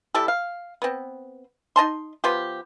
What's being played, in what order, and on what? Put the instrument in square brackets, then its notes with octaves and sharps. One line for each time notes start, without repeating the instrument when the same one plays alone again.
[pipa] G3 E4 G4 A4
F5
B3 C4
D#4 D#5 A5 C6
F3 B3 F4 G4